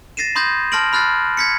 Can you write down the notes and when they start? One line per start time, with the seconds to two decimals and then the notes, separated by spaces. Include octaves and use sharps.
0.17 A6 A#6 C7 D#7 E7
0.35 B5 C6 D#6 G6 G#6 A#6
0.72 A5 C6 F6 A#6 D7 F#7
0.93 B5 F6 F#6 A6 C7
1.37 G#6 B6 C#7